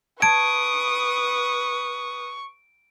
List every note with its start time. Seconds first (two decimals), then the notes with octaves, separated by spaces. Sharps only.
0.22 B4 A5 C#6 D#6 G#6 D7